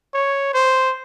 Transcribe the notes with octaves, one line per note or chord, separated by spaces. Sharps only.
C#5
C5